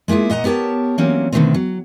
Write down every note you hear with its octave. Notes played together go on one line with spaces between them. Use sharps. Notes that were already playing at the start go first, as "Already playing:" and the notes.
G#3 A#3 E4 F4 G#4
A#2 D#5 F#5 A#5
B3 G4 A#4 C#5 A5
E3 F#3 G3 A#3 C4 C#4
B2 D3 D#3 F3 A3 C4
F#3